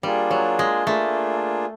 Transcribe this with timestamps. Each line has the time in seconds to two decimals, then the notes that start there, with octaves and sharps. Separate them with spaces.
0.03 G3 A#3 D4 F4 G#4
0.31 F#3
0.59 G#3
0.87 A3 A#3 D4 F4 G#4